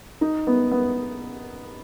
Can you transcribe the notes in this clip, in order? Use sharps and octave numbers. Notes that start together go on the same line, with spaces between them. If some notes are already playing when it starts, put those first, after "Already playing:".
D#4
B3
B3